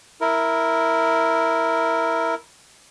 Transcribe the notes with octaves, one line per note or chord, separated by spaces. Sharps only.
E4 A#4